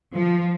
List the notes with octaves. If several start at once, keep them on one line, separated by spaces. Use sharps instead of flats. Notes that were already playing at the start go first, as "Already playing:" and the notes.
F3